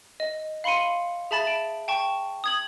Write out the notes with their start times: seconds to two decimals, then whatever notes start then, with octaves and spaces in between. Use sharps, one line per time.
0.20 D#5
0.64 F5 B5 C6 C#7 D#7
1.31 G#4 E5 A5 B5 A6 E7
1.45 A5 D7
1.88 G5 A5 C#6
2.44 D#6 G#6 F#7